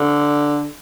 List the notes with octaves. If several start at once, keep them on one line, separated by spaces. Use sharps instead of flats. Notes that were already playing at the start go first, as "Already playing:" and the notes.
Already playing: D3